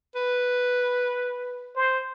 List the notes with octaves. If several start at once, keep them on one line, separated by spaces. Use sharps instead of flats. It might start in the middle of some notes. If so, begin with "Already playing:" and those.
B4
C5